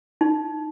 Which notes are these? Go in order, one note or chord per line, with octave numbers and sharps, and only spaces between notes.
D#4